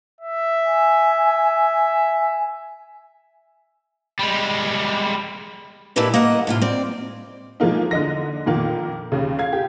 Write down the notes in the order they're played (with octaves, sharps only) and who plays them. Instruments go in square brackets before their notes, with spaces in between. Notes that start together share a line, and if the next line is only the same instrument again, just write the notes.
[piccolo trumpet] E5
[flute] G#5
[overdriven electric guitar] G3 G#3
[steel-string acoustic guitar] A#2 A3 E4 G4 B4 D#5
A#3 D#5 F#5
A2 C3 F4
C4 D5
[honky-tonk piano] E3 F3 G#3 A#3 D#4
D3 D#5 A#6
F2 A#2 D#3 A#3
D#2 C#3
F5 G#6
G4